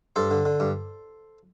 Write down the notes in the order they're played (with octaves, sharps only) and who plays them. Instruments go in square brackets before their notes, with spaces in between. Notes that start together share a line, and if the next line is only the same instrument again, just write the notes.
[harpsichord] G2 A4 C5
D3
D3
G2